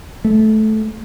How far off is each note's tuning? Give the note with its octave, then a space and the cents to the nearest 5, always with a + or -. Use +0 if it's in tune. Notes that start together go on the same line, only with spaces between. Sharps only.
A3 -15